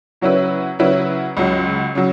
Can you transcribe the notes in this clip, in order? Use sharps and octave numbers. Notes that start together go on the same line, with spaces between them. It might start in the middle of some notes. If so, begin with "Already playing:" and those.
C#3 F#3 C#4 E4 B4
C#3 F#3 C#4 E4 B4
C#2 C#3 F#3
C#3 F#3